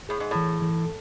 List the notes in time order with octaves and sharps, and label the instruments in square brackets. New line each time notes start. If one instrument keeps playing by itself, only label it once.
[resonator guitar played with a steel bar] A2 [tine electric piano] G#4
[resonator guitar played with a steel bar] G#2
[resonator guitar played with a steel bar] A2 [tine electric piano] E3
[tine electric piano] E3